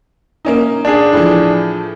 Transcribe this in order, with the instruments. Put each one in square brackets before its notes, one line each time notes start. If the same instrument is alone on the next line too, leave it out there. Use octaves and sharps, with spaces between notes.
[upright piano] A#3 C#4 D#4
[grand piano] D4 G#4
[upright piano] A2 E3 F3